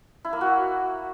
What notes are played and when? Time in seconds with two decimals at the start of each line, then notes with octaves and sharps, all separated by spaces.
0.25 E4
0.33 A#3
0.41 F#4